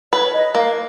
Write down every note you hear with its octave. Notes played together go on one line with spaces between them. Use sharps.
B4 C#5
D#5
A#3 F5